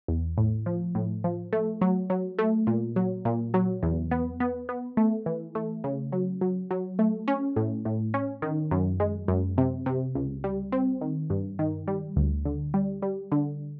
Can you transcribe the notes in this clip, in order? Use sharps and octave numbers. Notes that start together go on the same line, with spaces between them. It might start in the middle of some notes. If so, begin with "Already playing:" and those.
E2
A2
F3
A2
F3
A3
F#3
F#3
A3
A#2
F#3
A#2
F#3
E2
B3
B3
B3
A3
E3
A3
C#3
F#3
F#3
F#3
A3
C#4
A2
A2
C#4
D#3
F#2
G#3
F#2
C3
C3
C#2
G3
C4
D#3
G2
D#3
G3
D2
D3
G3
G3
D3